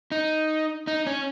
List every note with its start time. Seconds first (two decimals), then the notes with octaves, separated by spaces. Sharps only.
0.12 D#4
0.87 D#4
1.07 C#4